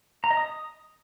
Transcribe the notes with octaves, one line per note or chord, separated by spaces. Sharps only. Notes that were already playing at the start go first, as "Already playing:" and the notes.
A#5
D#5
D#6